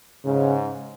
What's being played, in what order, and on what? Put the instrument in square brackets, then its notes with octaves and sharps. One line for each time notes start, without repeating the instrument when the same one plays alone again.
[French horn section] G#2 [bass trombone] C#3